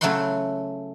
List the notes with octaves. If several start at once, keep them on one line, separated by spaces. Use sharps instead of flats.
C#3 F#3 A3 E4 F#5 C6